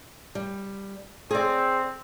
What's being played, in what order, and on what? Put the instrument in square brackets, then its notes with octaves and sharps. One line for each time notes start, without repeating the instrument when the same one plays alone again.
[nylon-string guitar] G3
[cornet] C4 [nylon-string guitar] G#4 D5